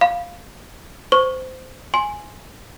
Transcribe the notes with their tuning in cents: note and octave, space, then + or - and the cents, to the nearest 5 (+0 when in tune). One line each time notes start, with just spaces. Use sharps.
F5 +0 B5 +0
C5 -20 C#6 +0
G#5 +0 C6 +20